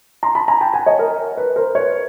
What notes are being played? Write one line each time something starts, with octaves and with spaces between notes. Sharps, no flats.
A#5 C6
A5 B5
G#5 A#5
G5 A5
F#5 G#5
C#5 D#5
A#4
B4
A#4 C5
B4 C#5